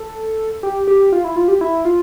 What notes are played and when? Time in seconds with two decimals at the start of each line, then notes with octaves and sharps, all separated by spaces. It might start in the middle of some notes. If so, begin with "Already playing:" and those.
Already playing: A4
0.63 G4
0.87 G4
1.12 F4
1.24 E4
1.36 F4
1.48 G4
1.61 E4
1.85 F4